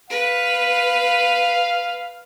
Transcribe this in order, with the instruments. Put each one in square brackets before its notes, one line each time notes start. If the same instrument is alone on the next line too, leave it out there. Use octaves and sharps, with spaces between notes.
[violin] B4 [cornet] F5